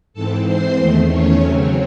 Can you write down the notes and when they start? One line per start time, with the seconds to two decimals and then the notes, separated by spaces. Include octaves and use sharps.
0.13 G#2 E3 C4 A4 A5
0.45 C5 C6
0.77 E2 D#3 A3
1.08 C#4 C#5
1.41 C#3 F#3 C4